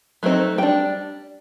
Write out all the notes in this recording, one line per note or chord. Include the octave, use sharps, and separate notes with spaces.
F#3 A3 C4 D#4
G3 G5
D4